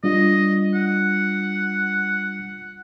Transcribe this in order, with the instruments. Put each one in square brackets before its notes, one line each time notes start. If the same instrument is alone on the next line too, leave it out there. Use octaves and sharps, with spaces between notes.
[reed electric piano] G3 D4 F4 [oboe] D#5
[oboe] F#5